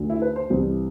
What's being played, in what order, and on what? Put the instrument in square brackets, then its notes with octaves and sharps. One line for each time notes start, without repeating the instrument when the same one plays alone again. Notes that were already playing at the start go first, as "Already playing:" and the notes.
Already playing: [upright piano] D2 D3 A3
E4
B4
C5
C2 C3 E3 G3 C4